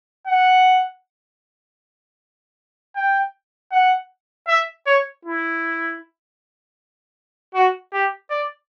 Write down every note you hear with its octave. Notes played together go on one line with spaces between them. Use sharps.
F#5
G5
F#5
E5
C#5
E4
F#4
G4
D5